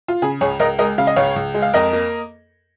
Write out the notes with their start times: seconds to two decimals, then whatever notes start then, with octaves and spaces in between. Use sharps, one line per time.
0.08 F4
0.22 C#3 G#4
0.41 C#2 G#4 C#5
0.59 C#2 A#4 D#5
0.79 G#3 A#4 D#5
0.98 C#3 F5
1.07 D#5
1.16 C#2 C#5 F5
1.36 C#2
1.54 G#3
1.62 F5
1.74 F2 A#4 D#5
1.93 A#3